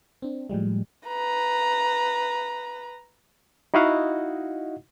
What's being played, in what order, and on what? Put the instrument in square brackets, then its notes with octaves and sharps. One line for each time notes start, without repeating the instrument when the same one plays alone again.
[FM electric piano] C4 D4
A2 F3 G3 G#3
[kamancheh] B4 A#5
[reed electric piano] D#4 E4 F#4 D#5 F5 F#5